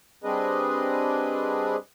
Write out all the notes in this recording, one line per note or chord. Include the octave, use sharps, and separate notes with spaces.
G3 C4 D4 G#4 B4 D#5